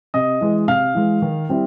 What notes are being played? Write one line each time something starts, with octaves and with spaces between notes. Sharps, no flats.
C3 D#5 D#6
E3 G#3
C3 F5 F6
E3 G#3
D#3
G3 C4 E4